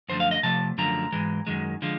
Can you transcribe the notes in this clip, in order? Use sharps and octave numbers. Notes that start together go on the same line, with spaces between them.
F#2 D3 F3 A3 C5
F5
D#5
C3 F3 A3 A5
F#2 D3 F3 A3 A#5
G#2 E3 G#3
F#2 D#3 G#3
D3 F3 G#3